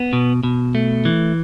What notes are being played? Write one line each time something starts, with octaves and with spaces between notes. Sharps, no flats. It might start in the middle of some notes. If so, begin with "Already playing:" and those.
Already playing: B3
B2
B2
A3
E3